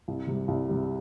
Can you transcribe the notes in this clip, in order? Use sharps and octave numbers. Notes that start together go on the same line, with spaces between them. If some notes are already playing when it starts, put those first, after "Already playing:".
C2
C3 G3
C2
C3 G3